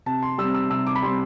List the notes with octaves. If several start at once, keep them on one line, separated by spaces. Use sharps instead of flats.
C3 A5
C6
G3 C4 E6
E6
C3 E6
D6
B5
G3 C4 C6